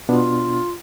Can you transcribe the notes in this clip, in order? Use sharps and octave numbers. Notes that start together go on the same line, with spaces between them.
B2 B3 D4 F4